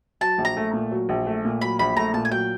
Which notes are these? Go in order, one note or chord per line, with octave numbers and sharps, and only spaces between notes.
F#3 A5
A#1
A#5
A3
A#2
F#3
A#1
A3
A#2
F#3 B5
A#1 B5
A3 A#5
A#2 A5
G#5
F#3 G5